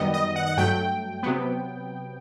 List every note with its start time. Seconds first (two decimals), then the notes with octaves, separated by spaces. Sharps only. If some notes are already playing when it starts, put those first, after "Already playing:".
Already playing: F#2 D#3 G3 B3 D#5
0.14 D#5
0.36 F#5
0.46 F#5
0.57 G2 F#3 A3 G5
1.23 C3 F#3 B3